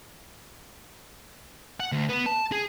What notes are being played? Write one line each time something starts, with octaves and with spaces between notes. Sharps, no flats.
F#5
D2
B3
A5
G#4